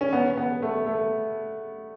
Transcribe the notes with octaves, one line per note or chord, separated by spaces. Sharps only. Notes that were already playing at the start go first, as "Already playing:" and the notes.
C#4
B3
B3
A3
A3